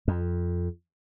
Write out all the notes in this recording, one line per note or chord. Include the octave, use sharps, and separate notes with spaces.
F2